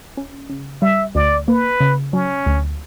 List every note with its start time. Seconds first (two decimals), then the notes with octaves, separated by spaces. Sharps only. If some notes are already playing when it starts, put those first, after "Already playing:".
0.17 C#4
0.49 C#3
0.82 G3 E5
1.15 D2 D5
1.48 A#3 B4
1.80 C#3
2.13 F#3 C#4
2.46 D2